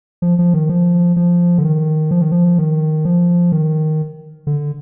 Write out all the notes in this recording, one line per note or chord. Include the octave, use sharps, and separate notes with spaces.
F3
F3
D#3
F3
F3
D3
D#3
F3
D#3
F3
D#3
F3
D#3
D3